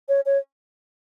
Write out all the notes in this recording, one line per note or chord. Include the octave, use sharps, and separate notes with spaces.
C#5
C#5